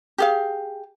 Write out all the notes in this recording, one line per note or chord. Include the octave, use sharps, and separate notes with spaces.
G4 G#4 F5